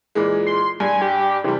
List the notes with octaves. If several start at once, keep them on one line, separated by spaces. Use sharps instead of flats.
A#2 E3 G#3
C6
G2 G#5
G4
C3 E3 G3